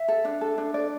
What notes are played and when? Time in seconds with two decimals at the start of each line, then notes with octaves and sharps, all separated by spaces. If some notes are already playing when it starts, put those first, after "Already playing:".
Already playing: E5
0.08 A4
0.25 D4
0.41 A4
0.58 D4
0.74 D5